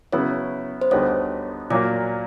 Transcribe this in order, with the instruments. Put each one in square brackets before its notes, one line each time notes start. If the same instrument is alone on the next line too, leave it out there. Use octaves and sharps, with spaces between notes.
[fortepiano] C#3 F#3 B3 E4 [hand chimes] C#5
[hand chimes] C5
[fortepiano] D2 D3 G3 B3 D#4 [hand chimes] C#5
[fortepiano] A#2 F#3 A#3 [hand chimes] D5